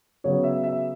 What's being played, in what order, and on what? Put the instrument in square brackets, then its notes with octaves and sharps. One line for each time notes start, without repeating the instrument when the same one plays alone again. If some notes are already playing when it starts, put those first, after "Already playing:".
[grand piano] C#3 F#3 B3 C#5
E5
E5